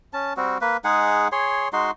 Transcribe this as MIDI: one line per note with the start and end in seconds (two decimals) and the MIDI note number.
0.13 0.33 61
0.13 0.33 81
0.37 0.58 55
0.37 0.58 60
0.37 0.58 66
0.61 0.77 58
0.61 0.77 71
0.84 1.28 56
0.84 1.28 63
0.84 1.28 68
0.84 1.28 78
1.32 1.68 68
1.32 1.68 73
1.32 1.68 84
1.73 1.91 56
1.73 1.91 63
1.73 1.91 66
1.73 1.91 84